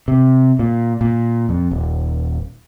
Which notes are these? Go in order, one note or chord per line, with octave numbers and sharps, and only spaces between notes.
C3
A#2
A#2
F2
D#1